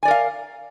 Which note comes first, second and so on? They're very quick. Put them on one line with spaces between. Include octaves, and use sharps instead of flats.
G#5 D5 A#4 F5